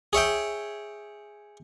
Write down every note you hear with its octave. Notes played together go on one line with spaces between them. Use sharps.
G#4 C#5 E5 G5